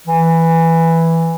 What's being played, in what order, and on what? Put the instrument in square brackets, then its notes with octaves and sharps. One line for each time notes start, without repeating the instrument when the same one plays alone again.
[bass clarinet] E3